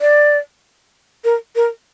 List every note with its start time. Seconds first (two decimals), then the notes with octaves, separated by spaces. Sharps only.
0.01 D5
1.24 A#4
1.56 A#4